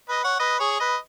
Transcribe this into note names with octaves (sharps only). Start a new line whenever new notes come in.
B4 D#5
C#5 F#5
B4 D#5
G#4 C#5
B4 D#5